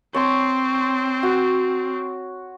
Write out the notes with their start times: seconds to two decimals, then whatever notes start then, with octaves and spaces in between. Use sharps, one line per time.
0.14 C4 C#5 A5 C6
1.23 F#4